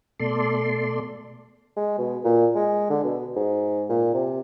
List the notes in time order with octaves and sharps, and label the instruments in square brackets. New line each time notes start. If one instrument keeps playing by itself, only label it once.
[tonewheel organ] B2 A3 A4 D5 C6
[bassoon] G#3
B2
A#2
G#3
D3
B2
G#2
A#2
C3